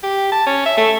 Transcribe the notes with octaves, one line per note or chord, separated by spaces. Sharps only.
G4
A5
C#4
E5
A3